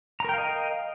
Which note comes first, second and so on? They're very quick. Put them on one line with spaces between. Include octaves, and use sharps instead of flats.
A#5 A#4 G5 F5 D#5